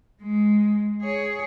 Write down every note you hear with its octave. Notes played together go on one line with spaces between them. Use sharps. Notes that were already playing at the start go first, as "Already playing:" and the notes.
G#3
G#4 C#5